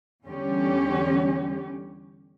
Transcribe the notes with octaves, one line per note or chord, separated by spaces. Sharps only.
E2 D3 G3 C#4 G4